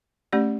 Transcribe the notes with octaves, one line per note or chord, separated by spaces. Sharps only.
A3 C#4 G4 D5